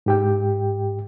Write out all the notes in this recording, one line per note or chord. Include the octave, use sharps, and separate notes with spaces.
G#2 G4 G5